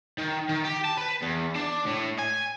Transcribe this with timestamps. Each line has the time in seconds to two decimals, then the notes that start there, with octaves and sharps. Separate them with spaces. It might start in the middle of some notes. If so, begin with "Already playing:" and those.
0.18 D#3
0.49 D#3
0.65 G4
0.85 A5
0.97 B4
1.22 E2
1.55 D4
1.86 A2
2.18 G#5